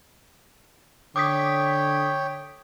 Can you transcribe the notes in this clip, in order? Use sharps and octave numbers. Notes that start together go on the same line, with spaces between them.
D3 C#5 G5 D6 D#6 B6